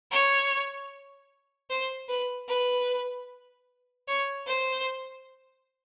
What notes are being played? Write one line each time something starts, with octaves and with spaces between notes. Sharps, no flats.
C#5
C5
B4
B4
C#5
C5